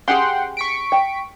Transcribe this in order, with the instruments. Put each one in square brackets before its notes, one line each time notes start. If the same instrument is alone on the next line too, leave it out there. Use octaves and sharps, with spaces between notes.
[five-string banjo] C#4 G4 G#4 [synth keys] F#5 G5 C6
[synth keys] C#6 B6 D7
[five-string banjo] G5